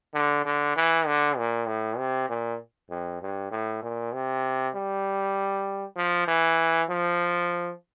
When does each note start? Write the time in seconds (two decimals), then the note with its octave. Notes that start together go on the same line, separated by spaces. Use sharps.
0.14 D3
0.45 D3
0.76 E3
1.07 D3
1.38 A#2
1.67 A2
1.98 C3
2.30 A#2
2.90 F2
3.22 G2
3.51 A2
3.83 A#2
4.14 C3
4.75 G3
5.96 F3
6.28 E3
6.90 F3